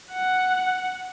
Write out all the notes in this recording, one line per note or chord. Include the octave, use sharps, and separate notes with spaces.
F#5